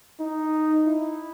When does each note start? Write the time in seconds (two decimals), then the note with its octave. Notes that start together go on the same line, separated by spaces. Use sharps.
0.20 D#4
0.87 E4